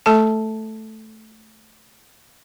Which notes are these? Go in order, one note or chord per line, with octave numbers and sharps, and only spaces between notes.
A3 A4 A5